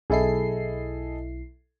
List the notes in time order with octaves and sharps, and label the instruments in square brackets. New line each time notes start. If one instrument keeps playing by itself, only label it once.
[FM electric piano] B1 E4 C7 [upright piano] G#4 A4 D#5